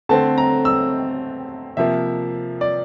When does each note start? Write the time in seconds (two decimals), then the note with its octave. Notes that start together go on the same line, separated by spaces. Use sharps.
0.09 D3 A3 C4 A5
0.38 A#5
0.65 E6
1.77 C3 F3 A#3 E5
2.61 D5